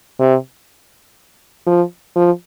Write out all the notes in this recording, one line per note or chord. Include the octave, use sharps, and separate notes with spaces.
C3
F3
F3